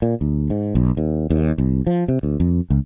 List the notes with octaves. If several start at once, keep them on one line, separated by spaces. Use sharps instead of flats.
A#2
D2
G#2
B1
D#2
D#2
C2
F3
C3
D2
F2
C#2